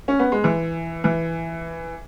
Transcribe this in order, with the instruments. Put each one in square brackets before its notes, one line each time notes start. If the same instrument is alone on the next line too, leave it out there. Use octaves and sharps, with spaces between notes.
[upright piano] C#4
B3
G#3
E3
E3